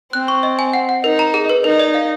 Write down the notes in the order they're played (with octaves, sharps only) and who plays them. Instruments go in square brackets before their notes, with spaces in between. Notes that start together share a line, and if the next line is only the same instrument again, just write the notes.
[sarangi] C4 [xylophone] F#6
[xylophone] C#6
D#5
G#5
F#5
F#5
[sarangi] D#4 [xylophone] A#4
[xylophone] A#5
G#4
B4
[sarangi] D#4 [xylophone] A#4
[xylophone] D5
F5